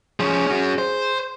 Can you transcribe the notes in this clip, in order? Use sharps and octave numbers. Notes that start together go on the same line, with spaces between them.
F3 C#4 G#4
C#4 F#4
C5